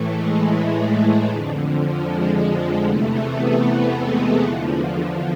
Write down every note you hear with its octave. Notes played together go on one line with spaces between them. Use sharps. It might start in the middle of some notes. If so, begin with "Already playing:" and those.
Already playing: A2 E3 A3
G#3
F2 D3
F3
G#3
E2 C3 E3 A3
B3
G#3
E2 D3 F3